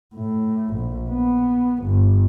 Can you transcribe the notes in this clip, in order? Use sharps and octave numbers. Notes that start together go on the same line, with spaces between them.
A2
A#1
B3
G1